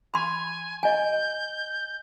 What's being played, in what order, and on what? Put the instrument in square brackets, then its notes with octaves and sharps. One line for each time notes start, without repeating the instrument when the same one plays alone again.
[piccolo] G#5 [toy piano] B5 C6
[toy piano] D#5 G#5 [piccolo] G6